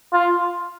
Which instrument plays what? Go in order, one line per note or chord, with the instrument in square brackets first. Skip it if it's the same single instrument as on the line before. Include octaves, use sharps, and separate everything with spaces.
[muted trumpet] F4